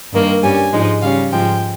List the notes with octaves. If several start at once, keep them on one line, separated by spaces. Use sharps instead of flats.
G2 D#3 A#3
G2 G3 C#4 G#5
G#2 F3 G#3 D#4
C#3 G3 C#4 F5
G#2 F3 G#3 G5